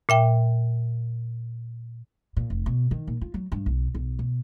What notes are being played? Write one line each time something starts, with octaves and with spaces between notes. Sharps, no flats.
A#2 E5 G5
A#2
F1
B2
D#3
A#2
F4
F#3
G2
B1
B1
B2